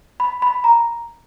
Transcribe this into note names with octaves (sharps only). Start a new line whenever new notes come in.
B5
B5
A#5